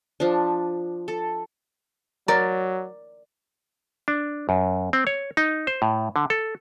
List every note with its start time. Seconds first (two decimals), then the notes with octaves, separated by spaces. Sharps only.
0.20 F3 D4
1.08 A4
2.28 F#3 A#4 D5 A#5
4.08 D4
4.49 F#2
4.93 C4
5.07 C#5
5.37 D#4
5.67 C5
5.82 A2
6.16 D3
6.30 A4